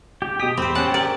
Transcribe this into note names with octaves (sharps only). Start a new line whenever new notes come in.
G4
B2 G4 D#6 B6
E2 C4 C5 B5
C#4 C#5 F#5 A5
A#4 D5